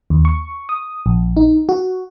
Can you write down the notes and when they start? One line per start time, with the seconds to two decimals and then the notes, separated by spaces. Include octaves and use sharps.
0.10 D#2
0.25 C#6
0.69 D#6
1.06 A#1
1.37 D#4
1.69 F#4